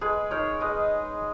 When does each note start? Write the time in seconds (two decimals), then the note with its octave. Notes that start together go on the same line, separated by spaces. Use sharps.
0.01 G#3 G#4 B4
0.31 D#4 A#4 C#5
0.61 G#3 B4 D#5